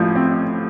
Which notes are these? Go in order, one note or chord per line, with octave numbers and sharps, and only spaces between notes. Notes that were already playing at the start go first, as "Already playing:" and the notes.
Already playing: A1 A2 F3
C4